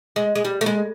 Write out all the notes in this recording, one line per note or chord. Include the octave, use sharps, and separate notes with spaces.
G#3
G#3
G3
A3
G#3